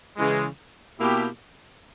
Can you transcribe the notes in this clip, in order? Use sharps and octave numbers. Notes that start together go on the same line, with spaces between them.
C#3 E3 G#3
B2 A#3 E4 G4